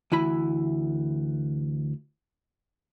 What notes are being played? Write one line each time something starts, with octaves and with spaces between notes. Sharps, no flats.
D2 E3 E4 B5